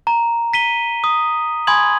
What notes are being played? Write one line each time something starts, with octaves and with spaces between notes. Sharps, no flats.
A#5
B6 D#7 G7
D#6
G#5 B5 C6 D#6 G#6 F#7